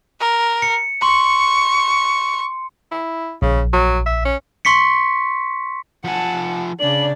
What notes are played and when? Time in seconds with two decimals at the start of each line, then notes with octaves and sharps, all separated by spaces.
0.20 A#4
0.62 C#7
1.02 C6 C#6
2.91 E4
3.42 A#1 C#3
3.73 F#3
4.06 E5
4.25 C#4
4.65 C6 C#6 B6 C#7
6.04 F3 F#5 G#5 A5
6.80 C#3 D4 D5 F#7